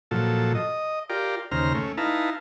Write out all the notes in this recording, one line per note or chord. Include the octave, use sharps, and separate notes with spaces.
A#2 F3 F#3 A4
D#5
F4 G4 A#4 D5
D#2 C#3 C5 A#5 F6
A3 C#4
D#4 E4 B4 F5 A5 A#5